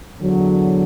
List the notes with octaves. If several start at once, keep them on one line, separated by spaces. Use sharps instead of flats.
E2 D3 F#3